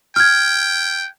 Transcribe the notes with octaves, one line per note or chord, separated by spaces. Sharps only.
G5 F6 G#6